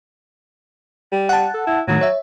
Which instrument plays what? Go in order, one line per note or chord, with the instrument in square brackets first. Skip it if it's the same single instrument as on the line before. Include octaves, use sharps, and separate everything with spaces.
[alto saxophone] G3
[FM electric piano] F#5 A5
[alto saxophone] A4
E4
[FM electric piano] A2 D#3 A3 [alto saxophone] F#3
[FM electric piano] C#5 E5